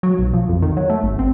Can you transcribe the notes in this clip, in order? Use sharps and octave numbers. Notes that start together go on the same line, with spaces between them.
F#3
B1
F3
F2
D#3
F#3
A3
G#1
C4